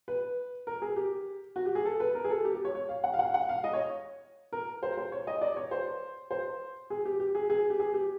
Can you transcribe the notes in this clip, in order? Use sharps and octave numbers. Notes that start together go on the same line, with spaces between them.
B4
A#4
G#4
G4
F#4
G4
G#4
A4
B4
A#4
G#4
A4
G4
G4
C#5
C#5
F5
F#5
F5
F#5
F#5
F5
D#5
C#5
A#4
C5
C5
C#5
D#5
D5
C#5
C5
C5
G#4
G4
G4
G#4
G#4
G4
G#4
G4